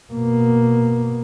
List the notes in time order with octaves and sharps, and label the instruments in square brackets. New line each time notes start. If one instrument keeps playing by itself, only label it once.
[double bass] B2 A#3